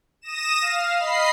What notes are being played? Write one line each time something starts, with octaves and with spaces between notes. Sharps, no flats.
D#6 A#6 E7
F5
D#5 B5 C7